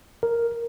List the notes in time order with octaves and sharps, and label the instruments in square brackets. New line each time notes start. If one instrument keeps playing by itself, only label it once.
[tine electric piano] A#4